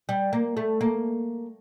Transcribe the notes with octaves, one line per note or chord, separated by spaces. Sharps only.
G3
A#3
A3
A#3